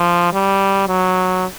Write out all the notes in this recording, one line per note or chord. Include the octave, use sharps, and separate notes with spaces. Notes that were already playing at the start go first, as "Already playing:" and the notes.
Already playing: F3
G3
F#3